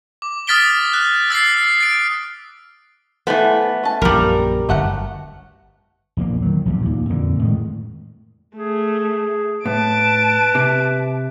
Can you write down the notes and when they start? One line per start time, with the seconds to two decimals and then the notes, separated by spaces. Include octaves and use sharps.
0.22 D6
0.47 D#6 F6 A6 B6 D7 G7
0.93 F#6
1.30 E6 A6 B6 C7
1.54 E6
1.80 A6 D7
3.27 E3 A3 B3 C5
3.83 C#4 A5
4.02 A#1 F#2 G3 A#4
4.69 G1 F#2 A3 F#5
6.17 A#1 E2 D3 A#3
6.42 D#3 F#3
6.66 A#1 E2 G2
6.82 D#2 A#2
7.09 F2 A#2 D3
7.39 A2 D#3 G#3
8.56 A3 G#4
9.66 A2 B4 A5 D7
10.55 C3